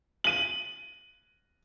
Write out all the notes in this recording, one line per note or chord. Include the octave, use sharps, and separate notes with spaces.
D#7 F#7